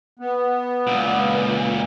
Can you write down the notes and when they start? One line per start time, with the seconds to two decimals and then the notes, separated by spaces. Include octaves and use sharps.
0.19 B3
0.87 C#2 A#2